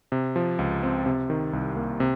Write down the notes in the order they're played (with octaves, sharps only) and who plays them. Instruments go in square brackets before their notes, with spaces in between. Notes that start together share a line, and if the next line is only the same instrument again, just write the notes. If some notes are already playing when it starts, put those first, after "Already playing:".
[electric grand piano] C3
F3
C#2
C4
C3
D#3
C2
A#3
C3